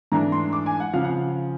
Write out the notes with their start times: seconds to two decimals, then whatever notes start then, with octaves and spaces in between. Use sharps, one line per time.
0.12 G#2 E3 A3 D4 A#5
0.32 C6
0.53 D6
0.66 G#5
0.80 F#5
0.94 C#3 F3 F5
1.04 F#5